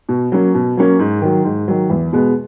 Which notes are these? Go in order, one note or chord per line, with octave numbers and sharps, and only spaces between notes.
B2
F#3 A#3 C#4
B2
F#3 A#3 C#4
G#2
D#3 F#3
G#2
D#3 F#3
E2
B2 G#3 B3